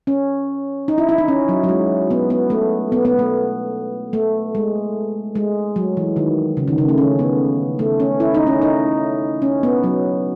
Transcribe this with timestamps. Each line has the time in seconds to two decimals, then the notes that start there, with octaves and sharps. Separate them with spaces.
0.07 C#4
0.88 D#4
0.98 E4
1.09 E4
1.18 D#4
1.28 C#4
1.49 F#3
1.64 F#3
1.69 G#3
2.10 B3
2.30 B3
2.50 A3
2.92 B3
3.05 B3
3.19 A3
4.13 A3
4.55 G#3
5.35 G#3
5.76 F#3
5.97 E3
6.16 D#3
6.57 C#3
6.68 D#3
6.78 C#3
6.89 A3
6.98 C#4
7.19 B3
7.79 A3
8.00 C#4
8.20 E4
8.34 D#4
8.47 C#4
8.62 D#4
9.42 C#4
9.63 B3
9.84 F#3